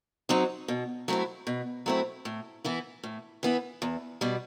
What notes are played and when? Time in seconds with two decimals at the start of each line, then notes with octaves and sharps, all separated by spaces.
0.29 F#3 C4 D#4
0.68 B2
1.08 F#3 A3 C4 E4
1.47 B2
1.86 F#3 A3 C4 E4
2.25 A2
2.64 E3 B3 E4
3.04 A2
3.43 E3 B3 E4
3.82 E2
4.21 B2 G3